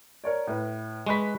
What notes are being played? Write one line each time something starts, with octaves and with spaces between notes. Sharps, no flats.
A#4 C#5 D5
A2 B4
G#3 B4 C#6 F#6 B6